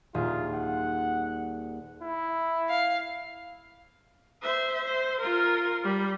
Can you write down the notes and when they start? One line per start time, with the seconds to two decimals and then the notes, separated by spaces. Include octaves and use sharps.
0.14 D#1 F4 G#4
0.54 F#5
2.02 E4
2.69 F5
4.42 C5 E5
4.84 C5
5.21 F4 A#4
5.83 G3 B5